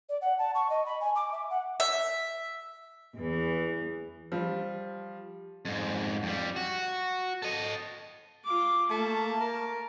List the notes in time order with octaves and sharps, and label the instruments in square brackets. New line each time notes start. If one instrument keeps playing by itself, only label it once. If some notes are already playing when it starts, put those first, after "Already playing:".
[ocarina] D5
F#5
A5
C#6
D#5
B5
G#5
D6
E5
F#5
[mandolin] E5
[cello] E2 E3
[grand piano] F3 G3
[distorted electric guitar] F2 G#2
F2 G3
F#4
A4 D#5
[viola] F4 D6
[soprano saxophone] A3 [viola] A#3 A5
[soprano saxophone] A#4